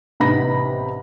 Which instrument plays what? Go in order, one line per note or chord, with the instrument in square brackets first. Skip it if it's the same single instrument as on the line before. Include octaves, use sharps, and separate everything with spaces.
[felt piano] A1 C3 B3 D#4 B5 A#6